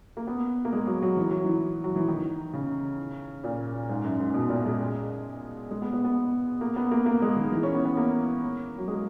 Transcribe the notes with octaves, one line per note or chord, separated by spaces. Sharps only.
A#3
B3
A#3
G#3
F#3
F#3
E3
F#3
E3
F#3
E3
D#3
C#3
A#2
G#2
F#2
G#2
B2
A#2
G#3
G#3
B3
B3
B3
A#3
B3
A#3
A#3
G#3
D#3
E3
C#4
B3
B3
A#3
F#3
G#3